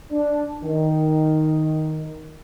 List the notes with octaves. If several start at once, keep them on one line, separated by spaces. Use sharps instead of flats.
D4
D#3